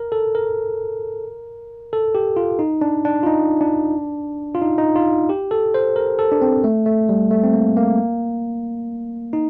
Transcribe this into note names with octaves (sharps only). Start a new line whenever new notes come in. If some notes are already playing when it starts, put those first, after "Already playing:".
Already playing: A#4
A4
A#4
A4
G4
F4
D#4
D4
D4
F4
D#4
D4
F4
D#4
D#4
F4
G4
A4
C5
A#4
A4
D4
C4
A3
A3
G3
A3
C4
A#3
A#3
D#4